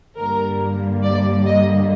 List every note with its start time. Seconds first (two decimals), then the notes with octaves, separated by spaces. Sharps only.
0.17 G2 D3 G3 A#3 A#4
1.03 D5
1.46 D#5